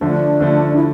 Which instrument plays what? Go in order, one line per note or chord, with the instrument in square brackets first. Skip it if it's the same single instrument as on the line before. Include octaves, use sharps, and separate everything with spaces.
[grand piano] D3 F3 A3 [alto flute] D4
[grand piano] D3 F3 A3
[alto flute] E4